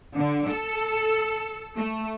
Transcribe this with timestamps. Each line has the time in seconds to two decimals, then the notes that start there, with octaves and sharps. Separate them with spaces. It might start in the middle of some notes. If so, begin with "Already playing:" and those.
0.14 D3
0.49 A4
1.77 A3